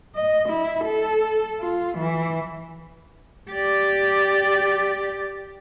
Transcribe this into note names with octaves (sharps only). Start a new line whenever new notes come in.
D#5
E4
A4
F4
E3
G4 D5